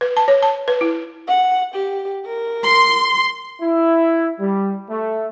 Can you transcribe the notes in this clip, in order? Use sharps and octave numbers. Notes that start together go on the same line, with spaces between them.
B4
A5
C#5
A5
B4
E4
F#5
G4
A#4
C6
E4
G3
A3